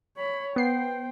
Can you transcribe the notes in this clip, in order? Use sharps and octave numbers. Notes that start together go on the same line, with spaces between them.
C#5 B5
B3 C5 G5 C7